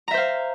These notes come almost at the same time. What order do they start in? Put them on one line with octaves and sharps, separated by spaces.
A#5 E5 C5 F5